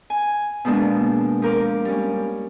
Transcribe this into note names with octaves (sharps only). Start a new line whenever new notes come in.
G#5
B2 F3 G#3 A#3 D4
F3 A#4 D6
G3 C#4